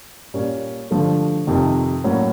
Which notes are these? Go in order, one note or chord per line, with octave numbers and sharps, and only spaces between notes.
A#2 G3 A#3 C#4
G2 D3 F3 A3
F2 C3 D#3
A2 F#3 A#3 C#4